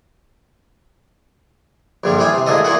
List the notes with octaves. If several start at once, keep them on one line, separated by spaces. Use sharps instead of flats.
A#1 G2 D3 F3 G3
E3 G3 G#4 G5
C3
A2 D3 G#3 A#3 A4 D#5
A#2 E3 A#3 F#4 G#4 F#5